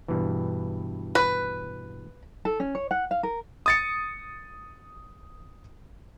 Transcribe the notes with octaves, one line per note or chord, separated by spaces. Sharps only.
G2 B2 E3
B4
A4
C#4
C#5
F#5
F5
A#4
D#6 A6 C#7